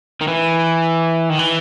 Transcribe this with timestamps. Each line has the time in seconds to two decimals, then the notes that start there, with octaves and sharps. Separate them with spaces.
0.21 D#3
0.27 E3
1.30 D#3
1.39 E3